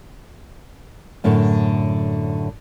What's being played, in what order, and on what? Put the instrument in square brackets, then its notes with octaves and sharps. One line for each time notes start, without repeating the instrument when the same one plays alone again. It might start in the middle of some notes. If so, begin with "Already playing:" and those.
[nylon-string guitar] F#2 A2 D3